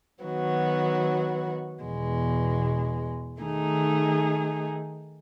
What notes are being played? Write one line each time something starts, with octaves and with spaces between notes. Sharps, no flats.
D#3 F#3 B3 F#4
E2 B2 G#3
D#3 A3 D#4 G#4